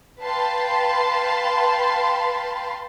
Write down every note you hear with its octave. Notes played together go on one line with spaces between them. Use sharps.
B4 F5 G5 A5 B5 C6